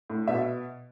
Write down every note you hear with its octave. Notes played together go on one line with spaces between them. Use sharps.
A2
B2 E5